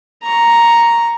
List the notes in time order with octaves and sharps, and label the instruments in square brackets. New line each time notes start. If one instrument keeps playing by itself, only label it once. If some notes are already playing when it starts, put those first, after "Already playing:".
[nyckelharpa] A#5 C#6